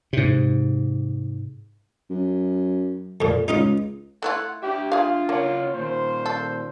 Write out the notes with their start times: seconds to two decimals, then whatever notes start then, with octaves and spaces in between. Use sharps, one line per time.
0.13 G#2 C3
2.10 F#2
3.21 F2 A#2
3.48 C#2 D#4 F4 D#5
4.22 A3 E4 F4 F#5
4.63 D4 G4 E5
4.92 F4 G#4 F5
5.29 C#3 A#3 C#5 F#5
5.74 A#2 D#3 C5
6.26 A4